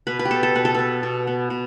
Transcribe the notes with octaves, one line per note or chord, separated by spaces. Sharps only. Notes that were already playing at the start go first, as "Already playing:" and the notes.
B2 B4
B4
G4
B3 A4
A4
B2 B4
A4
B3 B4
B2
B3
B2